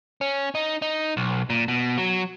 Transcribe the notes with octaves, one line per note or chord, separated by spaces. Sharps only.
C#4
D#4
D#4
B1
A#2
B2
F#3